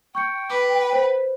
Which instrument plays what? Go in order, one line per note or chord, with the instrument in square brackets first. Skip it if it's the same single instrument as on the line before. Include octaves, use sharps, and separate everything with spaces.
[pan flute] G5 [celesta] C#6 G6 C#7
[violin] B4 [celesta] D6
[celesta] C5